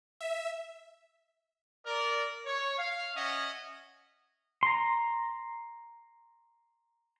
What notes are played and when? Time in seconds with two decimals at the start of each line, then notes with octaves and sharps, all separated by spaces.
0.21 E5
1.85 A#4 D5
2.45 C#5
2.78 F5
3.15 C#4 D#5 E5 F#5
4.63 A#5 C6